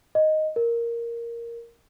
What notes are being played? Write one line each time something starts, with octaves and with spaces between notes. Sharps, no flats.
D#5
A#4